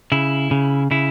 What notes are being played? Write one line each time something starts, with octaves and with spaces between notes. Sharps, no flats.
C#3 E4
C#3
C#3 E4